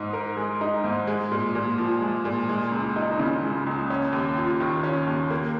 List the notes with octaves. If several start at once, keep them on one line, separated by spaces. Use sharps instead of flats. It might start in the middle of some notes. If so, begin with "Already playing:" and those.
Already playing: G#2 D#4
A#4
G#3
D#4
G#2
G#3
A#2
A#2
F3
G#3
A#2
G#3
C#2
D#4
C#3
G#3
C#2
C#4
D#2
F4
D#3
C#4
D#2
A#3